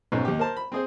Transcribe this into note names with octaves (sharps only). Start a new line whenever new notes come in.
B1 G#2 B3 C#4
D#2 G4
A#4 C5 A5
B5
C4 G#4 C5